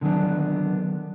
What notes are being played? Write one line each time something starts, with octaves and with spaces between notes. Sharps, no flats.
D3 D#3 F#3 B3 D4